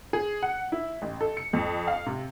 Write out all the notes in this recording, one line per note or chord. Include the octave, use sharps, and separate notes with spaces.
G#4
F#5
E4
A1
A4
C#7
F2
F5
C3